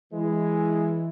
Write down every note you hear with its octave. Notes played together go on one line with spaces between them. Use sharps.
E3 G#3